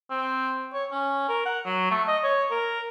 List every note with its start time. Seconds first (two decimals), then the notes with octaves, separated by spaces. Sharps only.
0.10 C4
0.74 C#5
0.91 C#4
1.28 A#4
1.46 F#5
1.65 F#3
1.91 A3
2.07 D#5
2.23 C#5
2.51 A#4